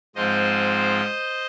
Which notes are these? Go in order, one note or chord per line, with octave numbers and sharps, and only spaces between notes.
G#2 F3 C4 C5 D#5